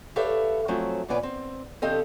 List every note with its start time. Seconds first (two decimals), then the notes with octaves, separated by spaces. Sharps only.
0.16 G4 A4 B4 C#5 E5 F5
0.68 F3 F#3 A3 C4 C#4
1.08 E2 A#2 B3 C#4 B4 D5
1.23 C4
1.82 D#3 C4 G4 A4 D#5 F5